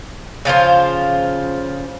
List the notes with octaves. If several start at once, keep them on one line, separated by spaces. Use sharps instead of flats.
C#3 F3 F4 C5